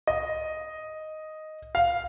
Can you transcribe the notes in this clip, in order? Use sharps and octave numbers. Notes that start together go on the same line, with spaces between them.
D#5
F5